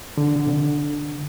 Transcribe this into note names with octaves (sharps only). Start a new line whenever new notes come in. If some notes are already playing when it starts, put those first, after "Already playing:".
D3
D3
C3
D3